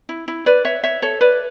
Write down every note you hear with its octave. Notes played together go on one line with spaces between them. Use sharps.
E4
E4
B4 D5
C#5 E5
C#5 E5
A4 C#5
B4 D5